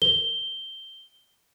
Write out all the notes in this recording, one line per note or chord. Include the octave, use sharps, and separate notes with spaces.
G7